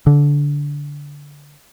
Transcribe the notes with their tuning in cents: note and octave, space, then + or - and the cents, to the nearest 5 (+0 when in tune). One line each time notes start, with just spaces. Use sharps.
D3 -20